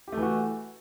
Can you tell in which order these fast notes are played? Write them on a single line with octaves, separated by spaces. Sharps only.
G4 A3 E3 F#4